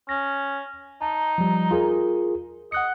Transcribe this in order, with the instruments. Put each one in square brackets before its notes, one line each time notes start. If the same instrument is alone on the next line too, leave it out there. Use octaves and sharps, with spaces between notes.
[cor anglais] C#4 [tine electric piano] A#6
[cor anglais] D#4 [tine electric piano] A5
[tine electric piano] F3 G3
F4 G#4 A#4
[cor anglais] D#5 [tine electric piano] F#5 F#6 C#7